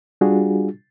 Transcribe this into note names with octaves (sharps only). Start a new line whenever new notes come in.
G3 D4 F4 F#4 G#4